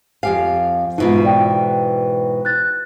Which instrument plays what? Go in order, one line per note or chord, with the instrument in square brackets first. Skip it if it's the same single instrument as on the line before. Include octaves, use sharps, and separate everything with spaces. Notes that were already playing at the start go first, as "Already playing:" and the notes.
[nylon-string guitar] F2 G4 F5 [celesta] G#5
[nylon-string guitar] G#2 B2 E3 [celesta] D#4 F4
[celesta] D5 G5
F#6 A6